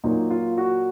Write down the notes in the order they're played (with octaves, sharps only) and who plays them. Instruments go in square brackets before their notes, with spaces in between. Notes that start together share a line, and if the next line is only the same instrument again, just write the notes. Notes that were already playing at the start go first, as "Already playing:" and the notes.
[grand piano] A#2 F#3 A#3 D#4
F4
F#4